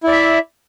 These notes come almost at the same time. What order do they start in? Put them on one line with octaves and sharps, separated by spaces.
E4 D5 E5